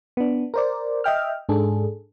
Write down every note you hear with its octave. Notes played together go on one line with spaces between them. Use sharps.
B3 D4
A#4 C5 D5
D#5 E5 G5 F6
G#2 D4 G#4 A4